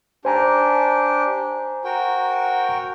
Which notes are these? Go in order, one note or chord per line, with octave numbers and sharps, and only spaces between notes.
D4 G4 C5 G#5 A#5
F#4 A#4 G5